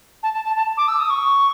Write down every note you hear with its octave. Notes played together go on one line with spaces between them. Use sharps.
A5
A5
A5
A5
D6
E6
D#6
C#6